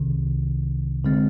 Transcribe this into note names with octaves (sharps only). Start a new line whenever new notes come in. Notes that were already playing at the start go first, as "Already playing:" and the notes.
Already playing: C2 C3 D#3
D3 G#3 C4